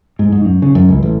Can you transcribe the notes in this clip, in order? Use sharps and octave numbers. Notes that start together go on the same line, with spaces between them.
G#2
G#2
F#2
C#3
F#2
C#2
A1